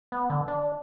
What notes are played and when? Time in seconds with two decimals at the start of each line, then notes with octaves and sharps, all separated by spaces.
0.12 B3
0.30 D3
0.48 D4